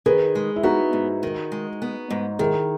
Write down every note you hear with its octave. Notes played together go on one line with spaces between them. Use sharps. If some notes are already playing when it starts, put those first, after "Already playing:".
D#3 G#4 B4
G#3
E4
B3 D#4 F#4
G#2
D#3
G#3
B3
G#2
D#3 E4 G#4